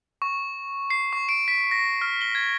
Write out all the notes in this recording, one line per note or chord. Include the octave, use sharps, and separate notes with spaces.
C#6
C7
C#6
D7
B6
A#6
F6
G7
G#6